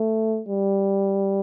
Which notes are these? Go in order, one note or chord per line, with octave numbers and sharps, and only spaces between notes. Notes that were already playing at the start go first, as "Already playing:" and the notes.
Already playing: A3
G3